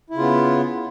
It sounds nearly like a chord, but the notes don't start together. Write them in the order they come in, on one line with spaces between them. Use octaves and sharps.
E4 C#3 F4 B3